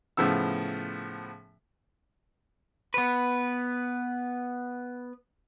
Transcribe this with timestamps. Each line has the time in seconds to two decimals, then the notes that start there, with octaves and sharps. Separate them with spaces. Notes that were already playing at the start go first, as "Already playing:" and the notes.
0.17 A2 C#3 F3 B3 E6
2.94 B3 B4